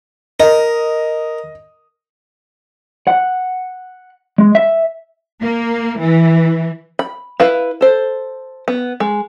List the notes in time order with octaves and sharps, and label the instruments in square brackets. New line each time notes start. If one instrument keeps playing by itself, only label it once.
[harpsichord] A#4 [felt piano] D#5
[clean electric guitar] F#5
G#3
E5
[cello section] A#3
E3
[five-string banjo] B5
E4 B4 F5
A4 C5
B3
G#3